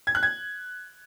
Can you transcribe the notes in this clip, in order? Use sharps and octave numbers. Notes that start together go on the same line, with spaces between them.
G#6
F#6
G#6